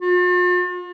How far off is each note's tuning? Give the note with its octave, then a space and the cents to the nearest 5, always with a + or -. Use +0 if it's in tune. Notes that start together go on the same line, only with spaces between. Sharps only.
F4 +45